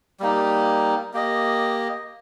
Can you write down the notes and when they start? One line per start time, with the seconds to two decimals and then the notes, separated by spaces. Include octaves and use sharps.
0.20 G3 A#3 D#4 G4
1.13 A#3 G4 D#5